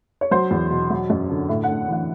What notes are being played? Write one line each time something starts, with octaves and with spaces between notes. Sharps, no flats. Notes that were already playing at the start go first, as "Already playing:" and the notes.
C#5
F#3 C5
E2
B2
F#3
F#2
D3
A2 E5
F#5
A2
E3 F#5